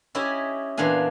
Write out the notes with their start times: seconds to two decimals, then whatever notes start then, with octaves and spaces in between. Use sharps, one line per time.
0.15 C#4 E4 G4 D#5 E5 G#5
0.77 E2 A#2 E3 D4 F5 G#5